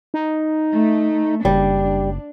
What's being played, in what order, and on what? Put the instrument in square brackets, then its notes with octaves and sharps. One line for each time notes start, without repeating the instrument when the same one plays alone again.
[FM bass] D#4
[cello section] A3
[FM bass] F#1 [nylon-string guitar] G3 [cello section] D4